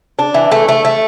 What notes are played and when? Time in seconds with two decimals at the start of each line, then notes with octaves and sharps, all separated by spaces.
0.19 D4
0.34 E3
0.51 A3
0.69 A3
0.85 A3